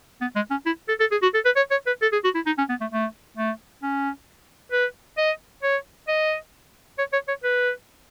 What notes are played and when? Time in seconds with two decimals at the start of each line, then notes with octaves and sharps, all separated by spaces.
0.21 B3
0.36 G#3
0.51 C#4
0.66 E4
0.89 A4
1.00 A4
1.12 G#4
1.22 F#4
1.34 A4
1.45 B4
1.56 C#5
1.71 C#5
1.87 B4
2.02 A4
2.13 G#4
2.24 F#4
2.35 E4
2.46 D#4
2.58 C#4
2.69 B3
2.81 A3
2.92 A3
3.37 A3
3.83 C#4
4.72 B4
5.18 D#5
5.63 C#5
6.08 D#5
6.99 C#5
7.13 C#5
7.28 C#5
7.44 B4